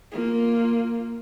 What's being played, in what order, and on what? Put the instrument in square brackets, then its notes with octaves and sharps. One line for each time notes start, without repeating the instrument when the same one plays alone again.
[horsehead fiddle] A#3 F4